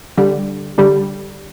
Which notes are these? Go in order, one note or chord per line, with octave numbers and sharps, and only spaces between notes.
D3 G3
D3 G3